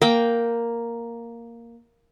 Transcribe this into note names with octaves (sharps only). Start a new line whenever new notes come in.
A#3 G5